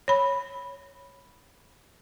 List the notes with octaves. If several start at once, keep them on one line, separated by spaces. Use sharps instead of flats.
C#5 B5